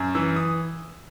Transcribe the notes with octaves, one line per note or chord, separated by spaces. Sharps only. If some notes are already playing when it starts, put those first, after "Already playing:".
Already playing: F#2
E3 E6
D#6